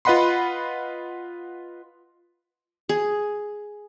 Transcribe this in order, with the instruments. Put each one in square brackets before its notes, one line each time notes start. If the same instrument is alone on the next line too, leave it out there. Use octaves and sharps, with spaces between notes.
[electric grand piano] F4 B4 D#5 F#5 B5 C6
[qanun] G#4